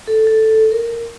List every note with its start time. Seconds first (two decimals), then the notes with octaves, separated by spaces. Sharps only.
0.07 A4
0.27 A4
0.72 A#4